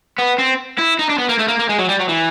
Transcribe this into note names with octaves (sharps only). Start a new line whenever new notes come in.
B3
C4
E4
D#4
D4
B3
A#3
A3
A#3
A#3
G#3
F#3
G3
F#3
E3